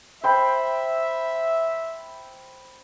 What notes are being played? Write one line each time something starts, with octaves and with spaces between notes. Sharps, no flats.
C5 E5 G5 B5